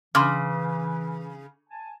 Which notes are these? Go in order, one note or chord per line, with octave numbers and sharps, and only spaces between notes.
C#3 E3 C6 D6 F6
G#5 A5